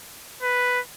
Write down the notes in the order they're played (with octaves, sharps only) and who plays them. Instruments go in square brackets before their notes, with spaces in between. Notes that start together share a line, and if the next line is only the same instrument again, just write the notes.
[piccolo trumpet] B4